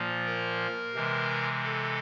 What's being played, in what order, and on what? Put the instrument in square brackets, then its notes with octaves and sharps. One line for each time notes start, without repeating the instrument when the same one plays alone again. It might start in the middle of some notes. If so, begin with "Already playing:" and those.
Already playing: [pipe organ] A#2 F3 A#3
A#4
C3 E3 G#3
A4